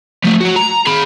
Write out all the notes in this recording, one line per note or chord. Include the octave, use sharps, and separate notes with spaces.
F3 A3
F#4 C#5
A#5
G#4 B5